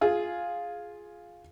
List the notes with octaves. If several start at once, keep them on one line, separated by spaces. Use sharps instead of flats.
F4 G#4